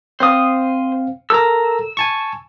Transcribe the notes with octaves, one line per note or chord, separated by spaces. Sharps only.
C4 C5 F5 D#6
A4 A#4 A#5 E6
G#5 A5 C#6